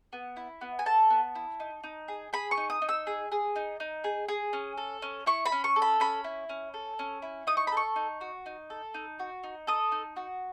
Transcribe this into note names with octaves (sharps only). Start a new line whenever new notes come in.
B3
E4
B3
G#5
A4 A5
B3
E4
D#4
D#4
G#4
G#4 B5
C#6
D#4
D#6
D#4
E6
G#4
G#4
D#4
D#4
G#4
G#4
C#4
A4
C#4
E4 C#6
B5
C#4
C#6
A4
B5
C#4 B5
E4
C#4
A4
C#4
E4
D#4 D#6
C#6
B5
A4 C#6
D#4
F#4
D#4
A4
D#4
F#4
D#4
A4 D#6
D#4
F#4